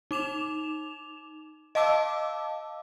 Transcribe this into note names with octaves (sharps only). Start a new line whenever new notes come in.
D#4 D6 E7 F7
D#5 F5 A5 D6 E6